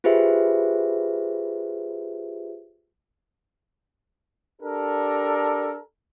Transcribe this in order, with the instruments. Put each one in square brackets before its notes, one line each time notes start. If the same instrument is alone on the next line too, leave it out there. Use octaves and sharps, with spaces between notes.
[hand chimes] F4 G4 G#4 B4 C5 E5
[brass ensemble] D4 G4 A4 A#4